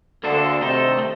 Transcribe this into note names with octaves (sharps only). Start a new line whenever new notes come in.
D2 D3 A#3 D4 A4 C5
C3 D#3 A3 D#4 A4 C5
A3